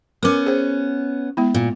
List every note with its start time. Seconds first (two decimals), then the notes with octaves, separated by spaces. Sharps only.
0.23 B3 C#4 A#4 D6
0.46 G#4 C5
1.37 G#3 B3 E4
1.54 A#2